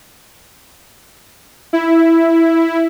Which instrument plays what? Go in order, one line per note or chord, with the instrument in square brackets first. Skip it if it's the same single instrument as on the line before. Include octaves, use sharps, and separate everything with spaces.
[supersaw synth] E4